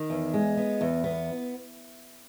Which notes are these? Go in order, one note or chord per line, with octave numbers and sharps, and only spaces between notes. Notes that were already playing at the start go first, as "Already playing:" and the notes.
Already playing: D#3
E2
G#3
B3
E2
B3